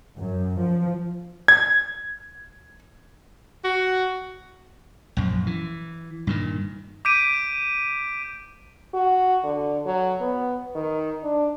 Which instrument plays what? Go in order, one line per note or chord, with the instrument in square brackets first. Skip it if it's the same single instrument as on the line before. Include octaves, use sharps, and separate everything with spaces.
[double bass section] F#2
F3
[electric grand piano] G#6
[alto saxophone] F#4
[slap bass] A#1 F#2
E3
G2 A#2 D#3
[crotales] D6 G6 B6 D7 D#7
[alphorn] F#4
D3
F#3
B3
D#3
D4